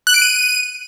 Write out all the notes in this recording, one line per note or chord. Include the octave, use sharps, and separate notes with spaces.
F#6
D7
D#7